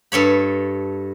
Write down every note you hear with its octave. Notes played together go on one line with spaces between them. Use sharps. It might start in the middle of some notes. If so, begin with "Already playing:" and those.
G2 A4 C#5 B5